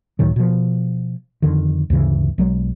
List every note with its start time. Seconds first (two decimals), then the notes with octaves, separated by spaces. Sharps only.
0.19 C#2 A2 D#3 F#3
0.36 B2 F3
1.42 F2 D3 D#3
1.90 D2 G2 C#3 E3
2.38 B1 F#3 G#3